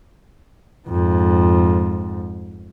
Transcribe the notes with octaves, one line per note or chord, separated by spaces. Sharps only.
F2 G#2